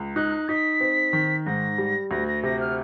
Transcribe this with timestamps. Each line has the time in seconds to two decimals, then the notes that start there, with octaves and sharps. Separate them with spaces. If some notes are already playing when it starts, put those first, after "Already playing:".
Already playing: C#2
0.16 D#4 F#6
0.48 D#4 B6
0.80 C4
1.13 D#3
1.46 G#2 A#6
1.78 G3
2.11 D2 A#6
2.28 A#6
2.43 C3 A#6
2.60 F6